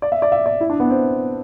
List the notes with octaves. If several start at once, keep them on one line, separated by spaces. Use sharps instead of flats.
D5
E5
D5
E5
D5
E4
D4
B3
C4